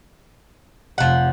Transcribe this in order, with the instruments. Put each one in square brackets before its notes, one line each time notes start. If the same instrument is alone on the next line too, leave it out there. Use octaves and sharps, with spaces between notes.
[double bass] F1 C3 [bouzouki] F3 F#5